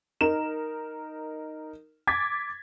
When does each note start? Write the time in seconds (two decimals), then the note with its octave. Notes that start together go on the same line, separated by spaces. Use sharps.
0.21 D#4 A#4 E7
2.07 D6 G#6 A6 B6